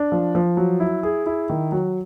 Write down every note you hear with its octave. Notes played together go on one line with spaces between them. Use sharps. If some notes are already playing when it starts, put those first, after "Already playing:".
Already playing: D4
F3
F3
F#3
E4
G#4
E4
D#3
F#3